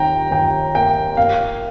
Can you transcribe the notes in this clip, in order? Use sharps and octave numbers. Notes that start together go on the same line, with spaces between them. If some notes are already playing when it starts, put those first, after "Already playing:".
Already playing: D#2 D#3 G5 A#5
D#2 G5
A#3 G5
A#3 F5